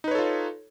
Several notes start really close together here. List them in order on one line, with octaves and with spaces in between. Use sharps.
D#4 B4 C#5 A4 F4